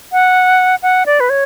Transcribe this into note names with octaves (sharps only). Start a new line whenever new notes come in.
F#5
F#5
D5
B4
C#5